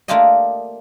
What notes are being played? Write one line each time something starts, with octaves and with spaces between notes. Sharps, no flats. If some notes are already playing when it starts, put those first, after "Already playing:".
A3 A#3 D4 F4 G4 D#5